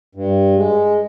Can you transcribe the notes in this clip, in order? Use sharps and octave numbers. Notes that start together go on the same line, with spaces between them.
G2
G#3